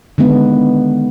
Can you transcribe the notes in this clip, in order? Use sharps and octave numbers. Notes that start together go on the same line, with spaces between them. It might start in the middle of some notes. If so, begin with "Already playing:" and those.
D3 D#3 G#3 B3